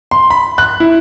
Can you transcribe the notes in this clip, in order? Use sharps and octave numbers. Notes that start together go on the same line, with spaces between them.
C6
B5
F#6
E4